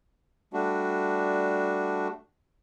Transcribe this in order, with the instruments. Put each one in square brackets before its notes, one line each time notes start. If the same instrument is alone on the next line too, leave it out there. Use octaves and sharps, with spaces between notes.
[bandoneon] G3 A3 D4 F#4